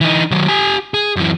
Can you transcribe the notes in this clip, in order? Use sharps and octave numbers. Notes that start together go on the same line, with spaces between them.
E3 D#4
D#3 F#3
G4 G#5
G#4
F#2 E3